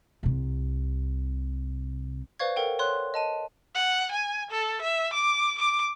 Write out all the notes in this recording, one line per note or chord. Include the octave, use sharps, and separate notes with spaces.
C2 C3
B4 C5 D5 F5 C#6 G#6
A4 A#4 F#5 G5
C#5 C6 F#6
D#5 A5 D#7
F#5
G#5
A4
E5
D6
D6